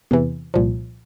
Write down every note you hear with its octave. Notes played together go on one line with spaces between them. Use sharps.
E2 C3 E3
C2 A#2 F3